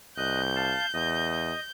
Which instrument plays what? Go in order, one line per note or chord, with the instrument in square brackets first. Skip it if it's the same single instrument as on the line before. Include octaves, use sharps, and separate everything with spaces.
[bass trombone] C2 [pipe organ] D#5 F#6 [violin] G6
[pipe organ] F5 A5
[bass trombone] E2 [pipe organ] D#5